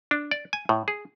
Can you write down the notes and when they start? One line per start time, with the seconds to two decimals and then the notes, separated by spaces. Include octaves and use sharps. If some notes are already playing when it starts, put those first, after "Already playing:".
0.11 D4
0.31 D5
0.53 G#5
0.69 A2
0.88 G#4